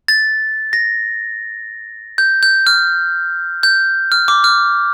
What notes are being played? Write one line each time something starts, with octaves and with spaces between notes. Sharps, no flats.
A6
A#6
G6
G6
F6
G6
F6
D6
F6